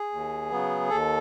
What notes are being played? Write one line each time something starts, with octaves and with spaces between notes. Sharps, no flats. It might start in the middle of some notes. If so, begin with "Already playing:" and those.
Already playing: G#4
D#2
C#3 F#3 B3
D#2 A4